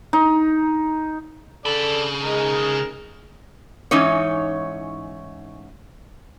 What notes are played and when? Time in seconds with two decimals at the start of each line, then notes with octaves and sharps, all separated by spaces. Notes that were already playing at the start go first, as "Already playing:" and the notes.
0.13 D#4
1.66 C#3 A4 D5 B5
2.23 G#3 D#4 A#4
3.91 G#2 E3 C#4 D#4 C#5